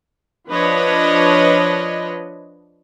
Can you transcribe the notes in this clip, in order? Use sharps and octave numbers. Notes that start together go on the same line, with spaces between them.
F3 D4 B4 C#5 D#5